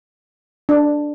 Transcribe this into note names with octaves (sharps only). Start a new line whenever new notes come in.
D4